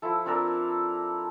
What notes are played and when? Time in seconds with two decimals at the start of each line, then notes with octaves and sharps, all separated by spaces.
0.02 F3 E4 A4
0.26 C4 D4 A4 A#4